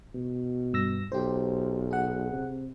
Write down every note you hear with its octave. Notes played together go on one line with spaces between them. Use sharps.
B2
G2 E6 A#6
B1 G4 C5
G#4 F#5
C3